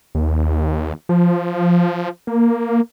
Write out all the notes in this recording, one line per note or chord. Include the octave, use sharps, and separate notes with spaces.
D#2
F3
A#3